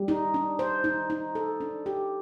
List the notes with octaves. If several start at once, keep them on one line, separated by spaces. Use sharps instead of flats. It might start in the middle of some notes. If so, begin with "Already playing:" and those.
Already playing: G3
D#4
D4
C5
D#4
D#4
A4
D4
G4